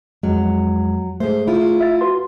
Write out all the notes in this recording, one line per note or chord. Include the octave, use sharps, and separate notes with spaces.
F2 F#3 G#3
G#2 A3 G#4 C5
E4 F4
E5 A6
F#4 B4 C6